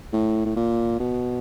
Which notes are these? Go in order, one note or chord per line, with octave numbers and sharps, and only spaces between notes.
A2
A2
A#2
B2